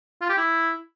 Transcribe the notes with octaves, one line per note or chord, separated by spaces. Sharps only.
F4
G4
E4